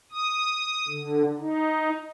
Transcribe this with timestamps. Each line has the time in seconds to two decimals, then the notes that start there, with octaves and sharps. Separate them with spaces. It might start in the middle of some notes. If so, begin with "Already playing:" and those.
0.12 D#6
0.88 D3
1.37 D#4